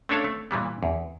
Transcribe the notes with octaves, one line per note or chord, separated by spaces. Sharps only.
A3 C#4 D4 A4 C#5 F5
A3
A#2 E3 G3 B3
E2